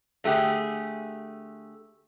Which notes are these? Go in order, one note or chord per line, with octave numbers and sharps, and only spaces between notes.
D3 A3 G4 G#4